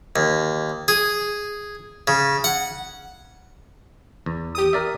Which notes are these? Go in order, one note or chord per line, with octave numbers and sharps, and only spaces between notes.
D#2
G#4
C#3
F#5
E2
G4 D#6
A#4 D5 E5